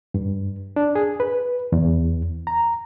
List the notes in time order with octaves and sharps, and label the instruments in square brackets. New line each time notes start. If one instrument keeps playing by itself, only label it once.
[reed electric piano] G2
D4
G#4
B4
E2
A#5